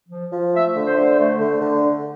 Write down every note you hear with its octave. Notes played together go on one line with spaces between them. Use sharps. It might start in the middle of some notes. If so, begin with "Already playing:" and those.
F3
F3
A3 E5
D3
C5
D3
A3
D3
D3